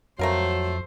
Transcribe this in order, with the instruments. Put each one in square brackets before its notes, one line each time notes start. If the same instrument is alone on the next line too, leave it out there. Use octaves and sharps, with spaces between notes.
[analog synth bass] F2 [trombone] F#3 [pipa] A3 A#4 F5 [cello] C5